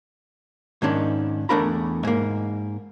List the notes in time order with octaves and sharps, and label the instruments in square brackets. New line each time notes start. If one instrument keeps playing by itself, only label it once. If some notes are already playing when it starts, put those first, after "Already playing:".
[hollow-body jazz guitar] G#2 D#3 C#4 D4
E2 A3 D4 A#4 A#5 B5
G#2 A#3